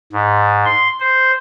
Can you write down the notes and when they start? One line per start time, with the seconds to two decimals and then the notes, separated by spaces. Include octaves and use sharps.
0.12 G#2
0.66 C6
1.00 C5